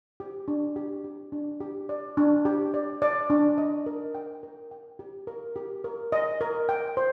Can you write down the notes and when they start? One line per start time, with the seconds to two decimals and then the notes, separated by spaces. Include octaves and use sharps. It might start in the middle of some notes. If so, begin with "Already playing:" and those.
0.20 G4
0.48 D4
0.76 G4
1.04 G4
1.32 D4
1.60 G4
1.89 D5
2.17 D4
2.45 G4
2.74 D5
3.02 D5
3.30 D4
3.58 D#5
3.86 A#4
4.15 G5
4.43 A#4
4.71 G5
4.99 G4
5.27 A#4
5.56 G4
5.84 A#4
6.12 D#5
6.41 A#4
6.69 G5
6.97 C5